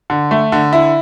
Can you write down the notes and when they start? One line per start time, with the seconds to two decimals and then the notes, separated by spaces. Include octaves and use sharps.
0.10 D3
0.31 A3
0.52 D3
0.73 E4